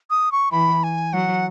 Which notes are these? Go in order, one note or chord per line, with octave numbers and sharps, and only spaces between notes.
D#6
C#6
E3 B5
G#5
F#3 F#5